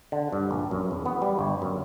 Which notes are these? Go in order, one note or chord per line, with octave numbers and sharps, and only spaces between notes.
D3
G2
A#1
F#2
E2
B3
G3
G1
F#2